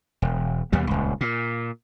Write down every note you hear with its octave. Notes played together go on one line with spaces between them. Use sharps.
E1
D#2 B2 G3
D#1 C#2
A#2